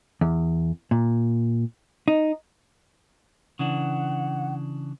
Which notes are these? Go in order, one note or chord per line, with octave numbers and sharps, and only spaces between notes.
E2
A#2
D#4
C#3 E3 D4 F#5